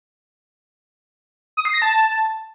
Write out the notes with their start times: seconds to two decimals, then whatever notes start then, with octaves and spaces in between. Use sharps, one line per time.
1.57 D#6
1.65 C7
1.74 A#6
1.82 A5